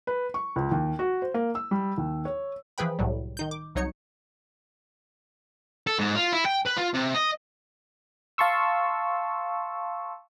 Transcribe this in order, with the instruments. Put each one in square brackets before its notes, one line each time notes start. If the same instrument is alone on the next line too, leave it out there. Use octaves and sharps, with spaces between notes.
[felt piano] B4
C#6
C#2
D#2
F#4
C5
A#3
E6
G3
D#2
C#5
[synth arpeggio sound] E3 F3 G#4 B4 G5 B5
C2 A2 F#3 G3
D#3 D#4 G6
D6
C2 F#3 D#4 C#5 C#7
[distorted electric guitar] A4
G#2
F4
E4
G5
B4
F4
C3
D#5
[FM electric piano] F5 A5 C6 C#6 E6